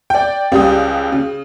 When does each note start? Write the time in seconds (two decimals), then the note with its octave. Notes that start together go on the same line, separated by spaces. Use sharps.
0.10 D5 G5
0.52 C#2 G3 G4 D#6
1.12 C#3